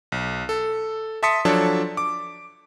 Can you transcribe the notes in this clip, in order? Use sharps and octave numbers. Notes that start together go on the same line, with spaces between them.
B1
A4
E5 A5 C6 D#6 B6 C#7
F3 F#3 D4 A4 C#5 A5
D6